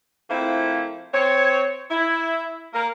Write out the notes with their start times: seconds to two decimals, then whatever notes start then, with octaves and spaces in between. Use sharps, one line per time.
0.30 F3 A3 A#3 C4 E4
1.14 C4 C#5
1.91 E4
2.74 A#3 A#4